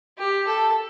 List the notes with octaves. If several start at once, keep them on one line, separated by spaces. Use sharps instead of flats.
G4
A4